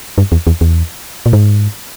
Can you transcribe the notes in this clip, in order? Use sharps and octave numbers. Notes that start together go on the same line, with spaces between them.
G2
E2
E2
E2
A#2
G#2